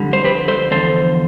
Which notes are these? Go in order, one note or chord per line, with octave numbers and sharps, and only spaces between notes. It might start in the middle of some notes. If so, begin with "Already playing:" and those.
Already playing: F2 D3 G3
C5
G4 B4
A4 C5
E2 D3 F3 A4 C5